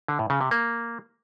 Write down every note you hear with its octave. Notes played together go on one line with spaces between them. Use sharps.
D3
A2
C#3
C3
A#3